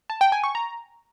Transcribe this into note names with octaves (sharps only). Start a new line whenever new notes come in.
A5
G5
G#5
C#6
A#5